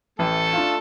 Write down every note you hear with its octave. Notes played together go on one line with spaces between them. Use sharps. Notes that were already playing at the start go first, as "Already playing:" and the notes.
A1 A3 A4
D4 F4